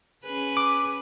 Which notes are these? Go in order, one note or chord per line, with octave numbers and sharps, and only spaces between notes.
C#4 G#4 B4
D6